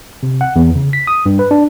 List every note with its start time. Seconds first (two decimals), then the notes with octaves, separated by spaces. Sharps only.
0.23 C3
0.41 F#5
0.56 E2
0.75 C#3
0.93 B6
1.07 D#6
1.26 G2
1.39 B4
1.51 D4